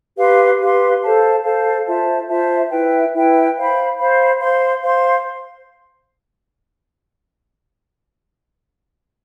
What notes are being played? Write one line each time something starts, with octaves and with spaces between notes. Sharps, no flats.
G4 B4 F5 C6
G4 B4 F5 C6
A4 C5 F5 A5
A4 C5 F5 A5
F4 C5 E5 A5
F4 C5 E5 A5
E4 B4 E5 G5
E4 B4 E5 G5
C5 F5 B5
C5 F5 B5
C5 F5 C6
C5 F5 C6